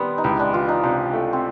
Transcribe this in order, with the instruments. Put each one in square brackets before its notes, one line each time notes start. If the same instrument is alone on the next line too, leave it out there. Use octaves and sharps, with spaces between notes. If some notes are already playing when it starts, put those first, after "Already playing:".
Already playing: [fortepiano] D#3 B3 [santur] G3 C4
[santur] D#4
[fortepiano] C#2 [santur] E4
[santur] D4
[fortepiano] E3 [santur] F4
[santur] D#4
[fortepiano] C3 [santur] D4
[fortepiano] A3
[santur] C4